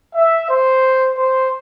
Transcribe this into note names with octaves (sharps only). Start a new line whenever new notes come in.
E5
C5
C5